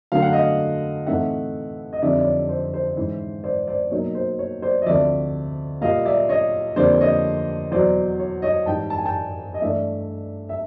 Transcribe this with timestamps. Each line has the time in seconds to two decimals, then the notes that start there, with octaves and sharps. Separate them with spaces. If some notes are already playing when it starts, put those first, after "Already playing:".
0.12 D3 F#3 A3 C#4 F5
0.22 F#5
0.32 D#5 F5
1.07 A2 E3 A3 C4 D#4 E5 F#5
1.93 D#5
2.02 F2 D3 G3 C4 D#4 D5 E5
2.20 D5
2.25 C#5
2.49 C5
2.74 C5
2.97 G#2 E3 G#3 C#4 E4
3.44 C5 D5
3.67 C5 D5
3.91 B2 F#3 A#3 D#4 C#5
4.15 C5
4.39 C#5
4.62 C5 D5
4.82 D#5
4.86 D2 C3 F3 D5 E5
5.81 A#2 G3 A#3 D#5 F5
6.05 D5 E5
6.29 C#5 D#5
6.76 F2 D3 G3 A#3 C5 D5
7.00 C#5 D#5
7.71 E2 B2 F#3 C5 D5
8.19 C#5
8.42 C#5 D#5
8.66 G#2 E3 G3 G5 A5
8.90 A5
8.98 G#5
9.05 G5 A5
9.54 D#5
9.61 G2 E3 A3 D5 E5
10.49 E5